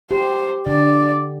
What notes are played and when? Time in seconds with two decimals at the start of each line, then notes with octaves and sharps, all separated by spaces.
0.11 G4 C5
0.67 D3 D5